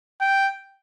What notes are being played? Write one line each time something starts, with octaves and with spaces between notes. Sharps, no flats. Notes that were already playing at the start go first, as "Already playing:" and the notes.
G5